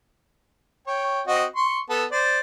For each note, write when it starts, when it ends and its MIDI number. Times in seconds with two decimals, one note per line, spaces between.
0.87 1.22 73
0.87 1.22 79
1.27 1.45 60
1.27 1.45 66
1.27 1.45 75
1.56 1.80 84
1.56 1.80 85
1.90 2.05 59
1.90 2.05 69
2.12 2.40 72
2.12 2.40 74